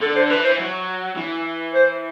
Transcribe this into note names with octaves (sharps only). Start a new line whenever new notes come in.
D3 A4
C5
E3 B4
C5
F#3
E3
C5